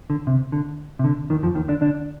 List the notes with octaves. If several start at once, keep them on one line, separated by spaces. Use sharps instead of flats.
D3
C3
D3
C3
D3
D#2 D#3
F2 F3
D#2 D#3
D3 D4
D3 D4